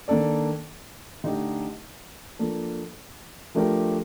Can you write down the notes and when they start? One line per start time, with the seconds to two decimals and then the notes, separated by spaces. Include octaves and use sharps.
0.08 D#3 A#3 D4 A4 D5
1.24 D3 A3 D#4 G4
2.39 F3 A#3 D4 A4
3.55 F3 A3 D4 G4 A#4